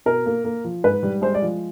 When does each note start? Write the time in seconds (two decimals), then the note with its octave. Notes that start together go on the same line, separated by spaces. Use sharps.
0.06 B2 A#4
0.26 A#3
0.44 A#3
0.64 F3
0.84 G#2 B4
1.03 G3
1.22 G#3 C5
1.34 D5
1.42 F3